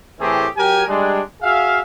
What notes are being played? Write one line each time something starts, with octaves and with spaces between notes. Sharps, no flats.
A2 E3 A3 C4 G4 G#4
F#3 G4 A#4 G5 G#5
G3 G#3 D4
F#4 G#4 E5 F5